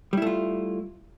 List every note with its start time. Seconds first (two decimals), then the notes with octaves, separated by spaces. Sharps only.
0.13 G3
0.17 E4
0.22 A3
0.27 F4